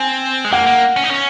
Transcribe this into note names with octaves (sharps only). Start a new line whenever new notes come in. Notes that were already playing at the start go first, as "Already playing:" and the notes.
Already playing: C4 G#5
G#3
A#3 F#5
A#3
C#4
D#4
C#4